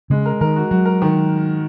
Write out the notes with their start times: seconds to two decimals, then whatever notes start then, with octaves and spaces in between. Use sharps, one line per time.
0.10 C#3 G#3
0.26 A#4
0.41 D#3 A#4
0.56 F#4
0.71 F#3 F#4
0.85 A#4
1.02 D#3